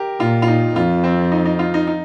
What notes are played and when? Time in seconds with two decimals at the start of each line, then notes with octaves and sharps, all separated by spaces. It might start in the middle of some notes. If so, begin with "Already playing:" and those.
Already playing: G4 A#4
0.20 A#2 F4
0.42 F4
0.48 D#4
0.76 F2 F4
1.04 C4
1.32 D#4
1.45 D#4
1.59 F4
1.74 D#4
1.87 D#4